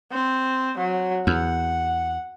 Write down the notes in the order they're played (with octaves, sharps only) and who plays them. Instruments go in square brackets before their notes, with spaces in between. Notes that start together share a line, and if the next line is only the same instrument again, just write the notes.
[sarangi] C4
F#3
[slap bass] E2 [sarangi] F#5